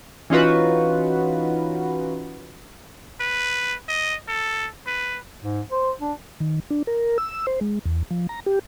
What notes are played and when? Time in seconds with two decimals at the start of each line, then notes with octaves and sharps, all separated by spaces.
0.30 E3 C#4 D#4 F4 F#4 B4
3.20 B4
3.88 D#5
4.28 A4
4.87 B4
5.41 G#2
5.72 C5
6.01 D4
6.40 D#3
6.70 D4
6.87 A#4
7.18 E6
7.47 C5
7.61 G#3
7.86 E2
8.11 F3
8.29 A#5
8.46 G4